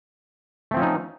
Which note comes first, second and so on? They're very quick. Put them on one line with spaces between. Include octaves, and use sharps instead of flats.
A3 C4 F3 C#4 D#4